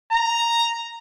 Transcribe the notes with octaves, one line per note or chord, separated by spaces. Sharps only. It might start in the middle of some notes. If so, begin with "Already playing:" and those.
A#5